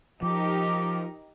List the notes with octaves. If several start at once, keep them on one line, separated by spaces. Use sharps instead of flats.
F3 D#4 G4 A#4 D6